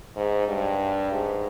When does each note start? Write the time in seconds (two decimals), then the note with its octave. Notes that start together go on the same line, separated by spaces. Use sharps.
0.16 G#2
0.48 G2
1.12 G#2